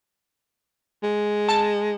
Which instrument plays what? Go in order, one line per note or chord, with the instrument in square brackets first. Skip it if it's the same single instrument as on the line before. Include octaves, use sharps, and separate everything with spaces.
[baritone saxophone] G#3
[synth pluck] A5